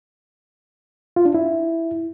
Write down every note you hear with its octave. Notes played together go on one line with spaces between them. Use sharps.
F4
D4
E4